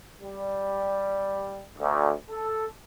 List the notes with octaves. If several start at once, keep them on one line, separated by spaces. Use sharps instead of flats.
G3
D2
A4